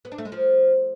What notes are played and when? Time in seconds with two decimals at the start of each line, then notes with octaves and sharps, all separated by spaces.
0.05 B3
0.12 D4
0.18 A3
0.25 G#3
0.32 F3